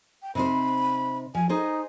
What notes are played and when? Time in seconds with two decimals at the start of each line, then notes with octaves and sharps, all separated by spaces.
0.23 G5
0.35 C3 D#4 C5 B5
1.35 F3 G#5
1.49 D#4 G#4 C5 D#5